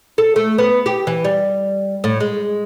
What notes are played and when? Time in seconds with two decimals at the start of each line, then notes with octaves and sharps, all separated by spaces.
0.18 A4
0.36 A3
0.58 B3
0.86 G4
1.07 E3
1.24 G3
2.04 A2
2.20 G#3